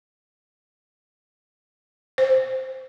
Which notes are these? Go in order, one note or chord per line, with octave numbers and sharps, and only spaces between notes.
C5